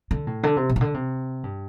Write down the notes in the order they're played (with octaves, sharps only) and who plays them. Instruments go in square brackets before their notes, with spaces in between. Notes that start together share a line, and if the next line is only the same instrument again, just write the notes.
[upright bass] D3
A2
D3
C3
A#2
C3
D3
C3
G2